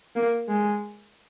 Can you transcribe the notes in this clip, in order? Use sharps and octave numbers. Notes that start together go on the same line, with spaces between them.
A#3
G#3